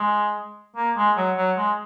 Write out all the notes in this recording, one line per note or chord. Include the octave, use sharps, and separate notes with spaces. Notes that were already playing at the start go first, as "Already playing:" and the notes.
Already playing: G#3
A#3
G#3
F#3
F#3
G#3